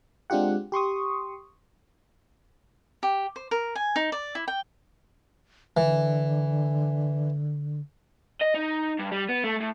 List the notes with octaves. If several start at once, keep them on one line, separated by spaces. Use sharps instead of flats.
G#3 C4 D4 F4 G4 F#5
G4 C6 C#6 D#6
G4
C5
A#4
G#5
D#4
D5
E4
G5
D3 E3
D#5
D#4
G2
G3
B3
A3
A2